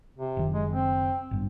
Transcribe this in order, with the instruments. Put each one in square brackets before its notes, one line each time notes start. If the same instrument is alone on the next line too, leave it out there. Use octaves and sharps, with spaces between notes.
[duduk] C3
[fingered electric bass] F#1 D#3
[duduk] G#3
C4
[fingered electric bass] G#1 G2